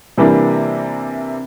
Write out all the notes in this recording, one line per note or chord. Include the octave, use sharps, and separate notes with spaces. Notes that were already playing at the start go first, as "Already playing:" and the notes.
C3 E3 G3 A#3 D4